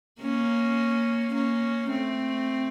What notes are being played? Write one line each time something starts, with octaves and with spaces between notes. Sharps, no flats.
A#3 C#4
A#3 C#4
A3 C4